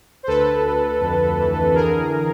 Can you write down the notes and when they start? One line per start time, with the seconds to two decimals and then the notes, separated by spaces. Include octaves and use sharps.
0.23 C5
0.27 D2 A4 B4
0.64 D2
1.01 F2
1.38 E3
1.74 D3 G#4 A#4